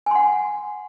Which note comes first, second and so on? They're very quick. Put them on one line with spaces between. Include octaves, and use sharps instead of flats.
G#5 C6 F#5